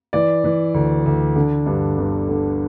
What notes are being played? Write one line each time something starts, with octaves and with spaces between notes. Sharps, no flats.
E3 D5
E3
D2
D2
D3
G2
G1
D3